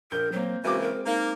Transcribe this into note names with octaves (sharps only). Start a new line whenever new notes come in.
A#1 A#4 G6
F#3 A#3 C4
C#3 E3 G#3 A#3 C4 F#4 D6
A#4
A#3 D#4